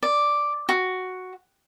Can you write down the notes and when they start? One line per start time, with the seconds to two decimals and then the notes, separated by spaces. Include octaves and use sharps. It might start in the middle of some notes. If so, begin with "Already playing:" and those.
0.03 D5
0.69 F#4